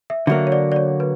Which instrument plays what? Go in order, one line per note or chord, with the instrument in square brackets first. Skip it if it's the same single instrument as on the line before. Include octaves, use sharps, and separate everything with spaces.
[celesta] E5
[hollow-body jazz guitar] D3 F#3 A#3 [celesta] E5
[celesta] C#5
D5
D5
C#5
B4